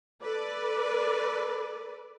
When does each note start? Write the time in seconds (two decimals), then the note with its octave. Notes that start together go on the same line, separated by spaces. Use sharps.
0.23 A4 B4 D5